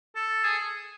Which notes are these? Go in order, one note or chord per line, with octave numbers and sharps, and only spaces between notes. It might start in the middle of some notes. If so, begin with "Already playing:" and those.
A4
G#4